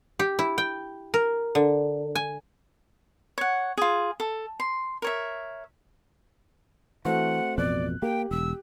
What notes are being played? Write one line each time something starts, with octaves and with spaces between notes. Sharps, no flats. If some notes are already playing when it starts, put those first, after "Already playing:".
G4
E4
G5
A#4
D3
G#5
C#5 F#5
F4 G#4
A4
C6
A#4 C#5 E5
E3 A3 C4 F#4 F#5
A1 F2 B2 D5 F#6
A#3 G4 G5
E1 E6